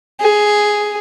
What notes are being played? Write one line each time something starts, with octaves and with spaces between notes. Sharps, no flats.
G#4